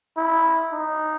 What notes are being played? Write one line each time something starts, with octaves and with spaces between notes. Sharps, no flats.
E4
D#4